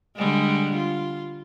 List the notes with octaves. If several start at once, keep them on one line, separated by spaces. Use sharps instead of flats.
D3 G3 G#3
F4